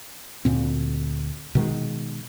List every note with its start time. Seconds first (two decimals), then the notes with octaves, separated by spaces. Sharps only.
0.45 D2 A#2 C4
1.55 B2 D#3 G#3